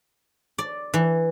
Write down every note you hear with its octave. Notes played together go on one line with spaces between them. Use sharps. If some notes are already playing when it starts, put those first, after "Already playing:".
D5
E3